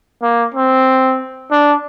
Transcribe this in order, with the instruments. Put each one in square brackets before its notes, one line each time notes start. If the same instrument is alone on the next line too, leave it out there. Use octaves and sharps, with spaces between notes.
[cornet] A#3
C4
D4